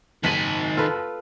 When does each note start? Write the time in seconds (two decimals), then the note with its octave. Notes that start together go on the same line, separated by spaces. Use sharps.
0.24 F#1 D#3 G#5 B6 F#7
0.77 F4 A4 B4